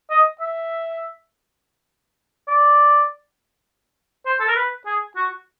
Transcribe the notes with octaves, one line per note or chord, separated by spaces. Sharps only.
D#5
E5
D5
C5
A4
A#4
B4
G#4
F#4